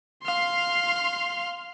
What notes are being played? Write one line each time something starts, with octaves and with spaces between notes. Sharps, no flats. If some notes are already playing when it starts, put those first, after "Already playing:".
F5 C6